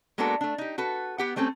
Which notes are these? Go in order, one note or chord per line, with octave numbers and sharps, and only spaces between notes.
G#3 A#3 B3 D4 F#4 A4
A3 D4
D#4 G4
F#4 A4 B4
B3 G4 F#5
G3 A3 C4 C#4 A4